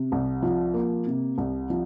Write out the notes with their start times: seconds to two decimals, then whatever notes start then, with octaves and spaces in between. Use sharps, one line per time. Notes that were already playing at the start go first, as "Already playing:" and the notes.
Already playing: C3
0.12 C2
0.43 F3
0.74 A#3
1.07 C3
1.38 C2
1.70 F3